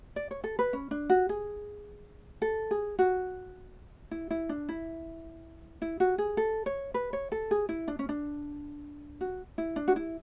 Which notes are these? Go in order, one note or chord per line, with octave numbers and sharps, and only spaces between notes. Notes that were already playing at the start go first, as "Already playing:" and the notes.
D5
C#5
A4
B4
C#4
D4
F#4
G#4
A4
G#4
F#4
E4
E4
D4
E4
E4
F#4
G#4
A4
C#5
B4
C#5
A4
G#4
E4
D4
C#4
D4
F#4
E4
D4
F#4
E4